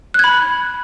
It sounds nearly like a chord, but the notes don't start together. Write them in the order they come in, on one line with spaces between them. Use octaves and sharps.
F#6 G#6 B5